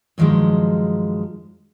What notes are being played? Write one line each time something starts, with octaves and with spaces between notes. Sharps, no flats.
G2 D#3 F3 F#3 G#3